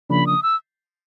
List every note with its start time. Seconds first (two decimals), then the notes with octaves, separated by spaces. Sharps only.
0.10 C#3 F3 A#3 D4 B5
0.27 D#6
0.43 E6